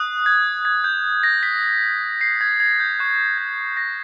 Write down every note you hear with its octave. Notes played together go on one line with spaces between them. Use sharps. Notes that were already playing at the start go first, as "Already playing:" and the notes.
Already playing: D#6 F#6
G#6
G#6
G6
A#6
B6
C7
G#6
G#6
G6
C#6 F#6
G#6
A#6